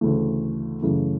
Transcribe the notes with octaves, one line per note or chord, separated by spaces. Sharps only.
D2 C#3 E3 A3
F#2 C#3 E3 A3